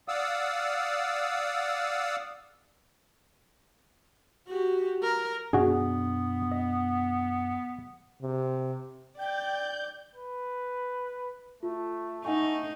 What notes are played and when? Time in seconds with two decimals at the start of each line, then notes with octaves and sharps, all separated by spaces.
0.08 D5 F5 F#5 D#6 E6
4.48 F#4 G4
5.03 A#4
5.53 F#2 B2 B3 D4 F#4 G#4
6.52 D#5
8.22 C3
9.19 D5 G5 G6
10.15 B4
11.63 A3 F4
12.25 A3 D#4 F#5 G#5 C#6